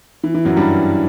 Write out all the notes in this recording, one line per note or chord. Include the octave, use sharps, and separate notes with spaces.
E3
E3
F#2 F#3
G2 G3